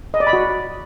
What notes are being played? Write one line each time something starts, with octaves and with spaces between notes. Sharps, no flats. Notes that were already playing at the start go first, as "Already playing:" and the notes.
D#5
D5
B5
F#4